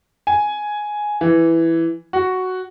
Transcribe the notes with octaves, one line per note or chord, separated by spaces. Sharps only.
G#5
E3
F#4